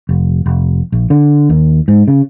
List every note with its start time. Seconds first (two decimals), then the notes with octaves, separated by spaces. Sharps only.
0.09 F1
0.46 F1
0.92 A#1
1.10 D3
1.50 D#2
1.88 G#2
2.08 C#3